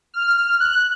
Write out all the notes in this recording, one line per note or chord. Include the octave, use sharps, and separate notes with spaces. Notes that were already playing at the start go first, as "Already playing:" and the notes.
F6
F#6